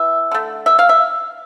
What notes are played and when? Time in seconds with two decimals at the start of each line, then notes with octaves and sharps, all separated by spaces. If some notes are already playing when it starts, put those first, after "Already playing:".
Already playing: E3 E5
0.31 D3 A3
0.66 E5
0.79 F5
0.89 E5